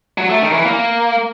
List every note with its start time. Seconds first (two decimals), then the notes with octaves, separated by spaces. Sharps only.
0.18 F#3
0.30 A3
0.41 D#3
0.53 E3
0.65 A#3